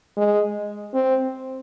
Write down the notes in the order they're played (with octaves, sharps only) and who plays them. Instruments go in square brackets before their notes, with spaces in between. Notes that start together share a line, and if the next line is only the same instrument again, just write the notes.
[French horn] G#3
C4